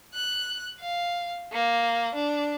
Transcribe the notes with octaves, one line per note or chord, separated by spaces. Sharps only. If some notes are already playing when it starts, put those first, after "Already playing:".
F#6
F5
A#3
D4